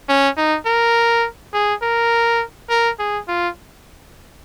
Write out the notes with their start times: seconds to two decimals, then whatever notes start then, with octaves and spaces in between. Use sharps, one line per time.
0.09 C#4
0.37 D#4
0.66 A#4
1.54 G#4
1.82 A#4
2.69 A#4
2.99 G#4
3.28 F4